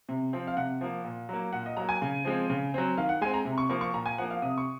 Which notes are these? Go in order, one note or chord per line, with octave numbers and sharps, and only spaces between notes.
C3
F3 C4
F5
C3 F#5
F3 A#3
A#2
F#3 A#3
A#2 F#5
D#5
F#3 A#3 A#5
G#5
C#3
F3 G#3 C4
C#3
F#3 C4
D#3 F5
F#5
G#3 C4 G#5
A#5
C3
C#6
F3 A#3 C#6
C#6
A#2 A#5
G#5
F3 A#3 F#5
F5
C3 D#6
C#6